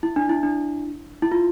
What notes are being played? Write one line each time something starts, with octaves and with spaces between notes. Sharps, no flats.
E4
D4
E4
D4
E4
F4